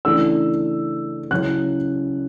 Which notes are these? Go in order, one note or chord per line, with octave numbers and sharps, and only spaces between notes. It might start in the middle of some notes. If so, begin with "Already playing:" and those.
C#3 E3 A3 D4 E6
C#3 F#3 C#4 E4 F#6